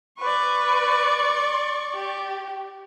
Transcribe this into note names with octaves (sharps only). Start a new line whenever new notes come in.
B4 D5 C#6
G4